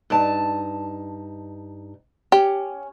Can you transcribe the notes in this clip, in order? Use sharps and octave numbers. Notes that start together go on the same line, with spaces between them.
G2 D#4 A5
C#4 G4